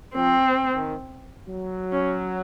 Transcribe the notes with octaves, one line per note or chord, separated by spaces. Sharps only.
F3 C4
D#3
F#3
C#4